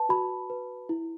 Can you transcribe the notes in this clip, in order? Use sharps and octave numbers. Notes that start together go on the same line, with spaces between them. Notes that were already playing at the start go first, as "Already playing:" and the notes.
Already playing: B4 A5
F#4 B5
B4
E4